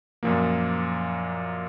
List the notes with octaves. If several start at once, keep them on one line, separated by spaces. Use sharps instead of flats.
F#2 A#2 F3 A#3